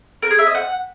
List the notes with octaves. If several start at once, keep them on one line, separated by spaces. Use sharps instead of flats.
A#4
G#4
E5
D#5
F#5